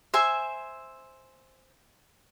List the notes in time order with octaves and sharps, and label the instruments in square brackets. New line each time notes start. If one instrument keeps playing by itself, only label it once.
[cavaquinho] C5 E5 G#5